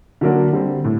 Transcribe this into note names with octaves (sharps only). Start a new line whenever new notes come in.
D3 F#3 A#3 D4
D3 G3 C4
A2